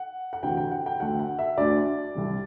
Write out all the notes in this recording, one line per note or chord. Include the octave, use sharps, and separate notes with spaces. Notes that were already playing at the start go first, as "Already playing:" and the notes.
Already playing: F#5
F#5
D2 C3 E3 G5
G5
F#5
G5
D2 D3 A3 F#5
F#5
E5
D2 D3 A3 D5
C2 C3 G3